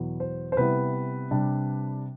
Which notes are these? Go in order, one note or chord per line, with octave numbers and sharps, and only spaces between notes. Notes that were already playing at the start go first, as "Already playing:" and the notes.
Already playing: E2 B2 F#3 B3
C5
C5
C3 G3 B3 E4 B4
C3 G3 D4